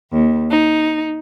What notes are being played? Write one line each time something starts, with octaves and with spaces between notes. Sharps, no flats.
D#2
D#4